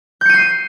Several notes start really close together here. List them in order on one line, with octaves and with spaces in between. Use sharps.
G6 C#7 D#7 C7